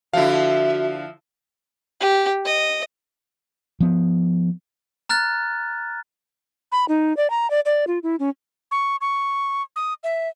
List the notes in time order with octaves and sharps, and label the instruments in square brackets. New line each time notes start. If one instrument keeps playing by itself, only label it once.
[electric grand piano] D3 F5 [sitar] F3 E4 [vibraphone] F#4 [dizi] E5
[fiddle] G4
D#5
[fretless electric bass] F3 B3
[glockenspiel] A#5 F6 F#6 A6
[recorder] B5
D#4
D5
A#5
D5
D5
F4
E4
C#4
C#6
C#6
D#6
E5